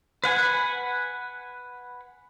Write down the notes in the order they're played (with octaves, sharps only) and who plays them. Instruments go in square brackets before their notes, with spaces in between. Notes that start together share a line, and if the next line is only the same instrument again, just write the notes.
[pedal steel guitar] B4 F#5 G#5